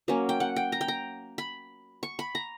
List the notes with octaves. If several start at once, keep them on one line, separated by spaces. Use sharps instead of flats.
F#3 A#3 C#4
G5
F#5
G5
A#5
G5
A#5
B5
C#6
B5
A#5